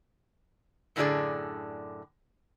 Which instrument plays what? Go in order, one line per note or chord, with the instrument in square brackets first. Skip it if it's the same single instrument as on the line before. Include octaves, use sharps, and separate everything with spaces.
[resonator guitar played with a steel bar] F#2 A2 D3 D4 G#4 D5